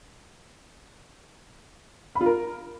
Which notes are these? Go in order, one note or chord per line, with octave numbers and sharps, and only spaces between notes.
B5
F4
A#4